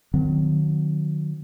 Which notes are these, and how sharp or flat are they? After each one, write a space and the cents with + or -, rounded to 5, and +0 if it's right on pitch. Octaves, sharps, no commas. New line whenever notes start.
D#3 -40 F#3 -25 C4 -35